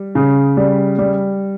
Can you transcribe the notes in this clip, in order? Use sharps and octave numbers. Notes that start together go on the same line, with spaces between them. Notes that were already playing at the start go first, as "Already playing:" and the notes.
Already playing: G3
C#3
G3
G3